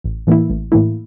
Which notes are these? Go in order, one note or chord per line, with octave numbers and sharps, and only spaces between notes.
A1
A2 E3 A#3 E4
A1
A2 E3 A#3 E4